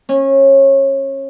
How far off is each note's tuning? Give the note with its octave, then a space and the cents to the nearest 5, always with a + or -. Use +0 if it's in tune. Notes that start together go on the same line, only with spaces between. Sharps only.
C#4 -25